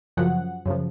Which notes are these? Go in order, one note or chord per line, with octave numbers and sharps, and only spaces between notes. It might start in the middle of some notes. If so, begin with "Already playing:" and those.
F#2 C#3 F3 F#5
F#2 C#3 F3